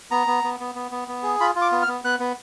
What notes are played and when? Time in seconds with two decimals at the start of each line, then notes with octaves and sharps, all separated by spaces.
0.11 B3 A#5
0.27 B3
0.44 B3
0.60 B3
0.75 B3
0.91 B3
1.08 B3
1.23 G#4
1.40 F4 B5
1.55 F4
1.61 D6
1.72 B3
1.82 F6
1.88 B3
2.04 B3 F#6
2.20 B3